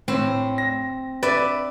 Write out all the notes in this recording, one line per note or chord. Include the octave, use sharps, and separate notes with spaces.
A2 C4
A#6
B4 D5 E5